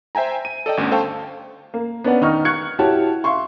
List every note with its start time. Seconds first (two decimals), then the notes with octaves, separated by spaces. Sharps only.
0.15 C5 E5 G5 G#5 A#5
0.45 D#7
0.66 A4 D5 D#5 G5
0.77 G1 D2 C#4 C#5
0.91 A4 C5 F5 G5 A5 C#6
1.74 A#3
2.04 B3 C#4 D4 B4 D5 F#5
2.21 D#3 D#4 D#5 C#6 F6
2.45 C#6 F#6 G#6 C#7
2.79 E4 F#4 G4 C#5 A5
3.24 E5 F5 C6 C#6